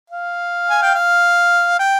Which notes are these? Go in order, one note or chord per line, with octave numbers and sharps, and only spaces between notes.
F5
G#5
G5
F5
G5